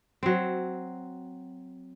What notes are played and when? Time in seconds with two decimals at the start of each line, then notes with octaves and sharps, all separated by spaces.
0.23 F#3 C4